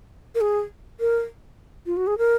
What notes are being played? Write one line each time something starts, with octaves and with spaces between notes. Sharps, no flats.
A#4
G#4
A#4
F4
F#4
G#4
A#4